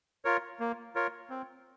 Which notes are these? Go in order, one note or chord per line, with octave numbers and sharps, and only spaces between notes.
F4 A#4 C#5
A#3
F4 A#4 C#5
C4